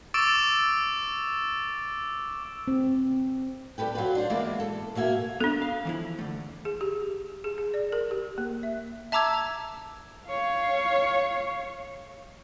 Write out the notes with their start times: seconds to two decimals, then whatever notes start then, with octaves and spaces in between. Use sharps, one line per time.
0.14 C#6 D6 E6 A6 D7 E7
2.68 C4
3.78 G3 A4 B4 G5
3.95 F#3 F4 B4
4.15 D4 F4 C5
4.30 E3 G#3 A#3 B3 D5
4.60 A4
4.95 B2 A#3 E5 G#5
5.40 B3 D4 A4
5.62 F5
5.85 E3 F3 E4
6.19 D3 A3
6.65 G#4
6.81 G4
7.44 G#4
7.58 G#4
7.74 D5
7.92 A#4
8.11 G4
8.38 A#3
8.63 E5
9.12 E5 A5 A#5 D6 E6 G#6
10.27 C#5 F5